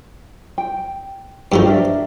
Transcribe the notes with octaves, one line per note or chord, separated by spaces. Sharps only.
G5
G2 D#3 F3 F#4 A4 G5
D4 A#4 E5